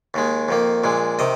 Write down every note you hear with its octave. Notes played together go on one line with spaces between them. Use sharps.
D#2 D#3 G#3
F2 D#3 A#3
A#1 A#2 G#3
C3 D#3 D#5